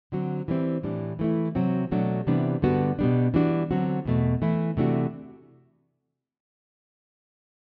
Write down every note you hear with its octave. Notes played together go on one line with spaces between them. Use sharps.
D3 F#3 C4 F#4
E3 G3 C4 E4
A2 E3 G3 D4
E3 A3 E4
C3 F#3 C4 F#4
B2 F#3 A3 D4 F#4
C3 E3 G3 B3 D4
G2 D3 G3 B3 F#4
B2 G3 B3 D4
E3 G3 D4 F#4
D3 F#3 C4 F#4
E2 B2 A3
E3 A3 E4
C3 E3 A3 D4 F#4